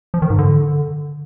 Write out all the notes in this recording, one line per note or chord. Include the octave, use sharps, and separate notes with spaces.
F3
D#3
G#2
D3